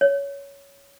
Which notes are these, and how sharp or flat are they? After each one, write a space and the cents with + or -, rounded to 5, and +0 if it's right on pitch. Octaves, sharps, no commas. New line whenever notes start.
C#5 +15